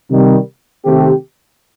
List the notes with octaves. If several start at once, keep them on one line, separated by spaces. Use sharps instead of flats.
C3 D#3 G3
C3 D#3 A3 C4 G4